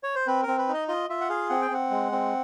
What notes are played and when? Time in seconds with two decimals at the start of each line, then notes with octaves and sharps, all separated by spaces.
0.03 C#5
0.15 C5
0.27 C4 B4
0.43 C4 A#4
0.58 B4
0.68 D#4
0.74 D#5
0.88 F4 D#5
1.10 F4 E5
1.21 F#5
1.29 G#4 F5
1.50 C4 F#5
1.62 G5
1.71 C4 F#5
1.91 G#3
2.12 C4